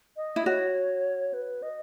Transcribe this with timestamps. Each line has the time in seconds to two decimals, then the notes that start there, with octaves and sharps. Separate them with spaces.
0.16 D#5
0.36 E4
0.46 F#4 C#5
1.33 B4
1.62 D#5